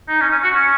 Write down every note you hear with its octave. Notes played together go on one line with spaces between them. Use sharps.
D#4
C#4
C#4
F#4
C#4